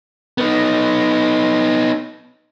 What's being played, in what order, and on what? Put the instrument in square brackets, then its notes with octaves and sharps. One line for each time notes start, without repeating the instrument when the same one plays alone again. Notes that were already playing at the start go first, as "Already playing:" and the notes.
[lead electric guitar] B3 D#4